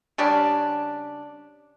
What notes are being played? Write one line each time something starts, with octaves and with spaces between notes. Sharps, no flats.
C#3 G3 C#4 D4